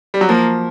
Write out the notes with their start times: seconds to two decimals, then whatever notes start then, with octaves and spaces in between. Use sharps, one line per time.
0.14 G3
0.21 F#3
0.29 F3 A#3